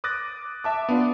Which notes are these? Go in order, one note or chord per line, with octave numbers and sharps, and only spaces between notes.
D6 D#6 F#6 A6 A#6
E5 A5 D6
B3 D4 F4